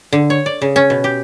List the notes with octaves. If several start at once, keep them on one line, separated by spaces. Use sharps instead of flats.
D3
C#5
D5
C#3
C#4
B2
G4